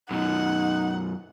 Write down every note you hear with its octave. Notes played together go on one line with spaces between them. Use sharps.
F#2 B2 D#4 F#5